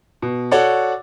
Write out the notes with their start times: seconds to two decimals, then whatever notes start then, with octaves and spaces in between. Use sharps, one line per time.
0.22 B2
0.51 F#4 A4 C#5 D5 F#5